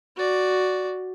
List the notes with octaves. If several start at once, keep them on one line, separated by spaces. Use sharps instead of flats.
F#4 D5